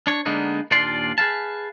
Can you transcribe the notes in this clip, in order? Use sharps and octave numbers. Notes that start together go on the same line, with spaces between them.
D4 C#5
D3 G#3 A#3 B3 D4 D#4
D#2 A#2 D4 F4 D5 C6
G#4 B4 F5 A5